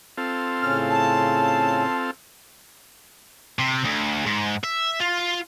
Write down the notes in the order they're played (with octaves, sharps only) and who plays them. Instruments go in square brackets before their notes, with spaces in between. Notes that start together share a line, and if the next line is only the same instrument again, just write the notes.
[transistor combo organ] C4 F4 A4
[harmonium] A2 C#3 C#4 [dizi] F6
[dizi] A5
[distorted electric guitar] C3
D2
G#2
E5
F4